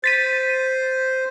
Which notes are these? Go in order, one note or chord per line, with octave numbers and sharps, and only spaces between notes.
C5 A6 B6 D#7